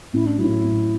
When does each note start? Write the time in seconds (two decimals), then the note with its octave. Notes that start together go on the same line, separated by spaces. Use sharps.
0.13 A1 E4
0.26 D4
0.38 A2 F#3 E4
0.64 A1